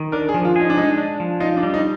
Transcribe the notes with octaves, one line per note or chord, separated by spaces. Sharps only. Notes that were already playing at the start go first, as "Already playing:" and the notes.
Already playing: D#3
D4 A#4
G#4
F3
F4
D#4 G#4
D4
G#3 D#4
D4
F3
D#4 F4
D4
G3
D#4